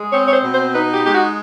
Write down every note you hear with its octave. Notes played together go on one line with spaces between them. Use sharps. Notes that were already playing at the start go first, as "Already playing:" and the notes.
Already playing: G#3
C4 C#5
C#5
C5
B2
C5
D#4 B4
G4
G#3 G4
F#4